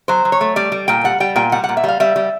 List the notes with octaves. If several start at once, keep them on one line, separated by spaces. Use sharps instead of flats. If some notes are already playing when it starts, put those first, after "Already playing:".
F#3 C5
F#3
C#5
A3
G3 D5
G3
A#2 G5
G3 F#5
G3 G5
A#2 G5
G3 F#5
F#5
A#2
E5
G3 F5
G3 E5
G3